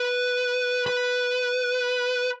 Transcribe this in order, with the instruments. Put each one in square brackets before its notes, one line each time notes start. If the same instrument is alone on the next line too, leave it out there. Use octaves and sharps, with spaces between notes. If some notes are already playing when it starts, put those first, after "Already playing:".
Already playing: [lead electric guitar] B4
B4